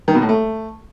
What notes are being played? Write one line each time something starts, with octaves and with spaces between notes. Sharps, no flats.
D#3
B2
A2
A3